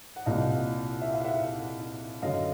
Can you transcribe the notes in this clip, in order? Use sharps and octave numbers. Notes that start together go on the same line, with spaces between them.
F#5
C2 A#2 D#5 F5
E5
F5
E5 F#5
F#2 D3 D#5 F5